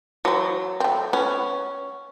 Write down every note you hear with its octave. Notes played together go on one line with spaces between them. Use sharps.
E3 F#3 C5
A3 C4
B3 C#4